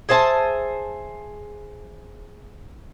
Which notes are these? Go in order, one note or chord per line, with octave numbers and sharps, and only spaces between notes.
G#4 C5 E5 A5